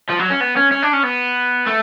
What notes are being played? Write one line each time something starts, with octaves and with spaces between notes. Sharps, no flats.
F3
F#3
C#4
B3
C#4
C#4
D4
C#4
B3
A3